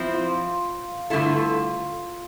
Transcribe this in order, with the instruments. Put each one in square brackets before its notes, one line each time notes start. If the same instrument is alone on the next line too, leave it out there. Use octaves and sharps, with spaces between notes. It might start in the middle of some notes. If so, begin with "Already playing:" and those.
Already playing: [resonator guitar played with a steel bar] F3 C4 E4
[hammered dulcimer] F4
[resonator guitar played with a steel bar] G2 D3 A3 E4 A4 [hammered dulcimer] F4